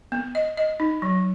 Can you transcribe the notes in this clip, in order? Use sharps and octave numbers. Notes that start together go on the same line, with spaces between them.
B3
D#5
D#5
D#4
F#3